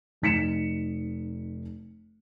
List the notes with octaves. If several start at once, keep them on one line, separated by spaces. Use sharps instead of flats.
F1 D#4 B6 C#7 E7